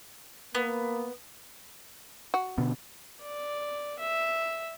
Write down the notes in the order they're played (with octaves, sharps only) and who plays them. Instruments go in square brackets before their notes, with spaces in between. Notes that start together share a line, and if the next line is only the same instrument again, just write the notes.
[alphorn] A#3 [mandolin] B3
[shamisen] F#4
[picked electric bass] B2 D3 B3
[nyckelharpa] D5
E5